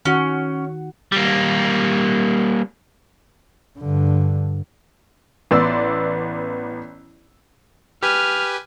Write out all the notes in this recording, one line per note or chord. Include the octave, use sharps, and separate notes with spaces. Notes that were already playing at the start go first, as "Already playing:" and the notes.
D#3 C#4 F#4 F#5
G3 A#3
G2 D3
A1 B3 D5 C6 E6
G4 B4 G#5 F6